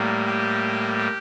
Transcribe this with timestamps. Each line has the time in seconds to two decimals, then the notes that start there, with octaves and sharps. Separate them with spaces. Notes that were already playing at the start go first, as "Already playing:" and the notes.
Already playing: A2 G3 A#3
0.27 G4